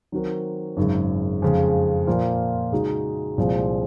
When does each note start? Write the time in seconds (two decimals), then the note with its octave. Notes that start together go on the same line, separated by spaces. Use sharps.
0.12 D#3 F#3 C4 F#4 A#4
0.77 G#1 F#2 C#3 G#3
1.42 F2 C#3 G#3
2.07 A#2 F3 A#3 F4 C5
2.72 C#3 G#3 D#4 F#4
3.38 C2 A#2 F3 G#3 C4